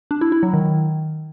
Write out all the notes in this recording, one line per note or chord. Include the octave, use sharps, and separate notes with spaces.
D4
E4
E4
F#3
D#3